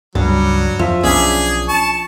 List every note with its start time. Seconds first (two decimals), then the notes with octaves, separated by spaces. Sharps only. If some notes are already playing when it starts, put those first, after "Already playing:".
0.15 C#2 G2 F#3 G3 D4
0.79 F2 F3 E5
1.03 B1 C#4 D4 G#4 B5
1.68 A5 C#6